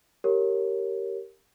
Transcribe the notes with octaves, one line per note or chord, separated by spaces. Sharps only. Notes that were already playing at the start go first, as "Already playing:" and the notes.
G4 A#4 C#5